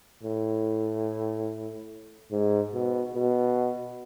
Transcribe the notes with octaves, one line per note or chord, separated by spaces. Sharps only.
A2
G#2
B2
B2